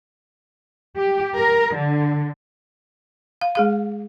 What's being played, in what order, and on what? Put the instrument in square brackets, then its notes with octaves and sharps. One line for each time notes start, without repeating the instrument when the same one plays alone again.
[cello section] G4
A#4
D3
[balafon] F5
G#3 G#4 F5